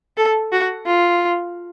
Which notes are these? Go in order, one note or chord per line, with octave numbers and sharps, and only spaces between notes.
A4
F#4
F4